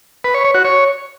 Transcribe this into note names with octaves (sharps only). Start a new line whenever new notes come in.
B4
C#5
C#5
F#4
C#5